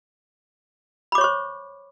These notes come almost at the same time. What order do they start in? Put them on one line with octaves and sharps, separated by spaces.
B5 D6 C#5 C#6 C5